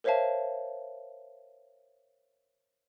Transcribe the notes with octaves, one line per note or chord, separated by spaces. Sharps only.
A#4 C5 C#5 E5 F5 A5